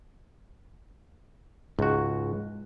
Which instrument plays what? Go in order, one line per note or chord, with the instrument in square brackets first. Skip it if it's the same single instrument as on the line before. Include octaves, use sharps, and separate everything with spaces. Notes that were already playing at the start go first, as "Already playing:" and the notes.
[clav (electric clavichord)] C#2 F#4 [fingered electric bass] G#2